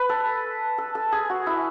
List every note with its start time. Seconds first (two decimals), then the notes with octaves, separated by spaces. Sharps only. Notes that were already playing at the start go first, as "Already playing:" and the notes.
Already playing: B4
0.09 A4
0.78 A4
0.95 A4
1.12 G#4
1.30 F#4
1.46 E4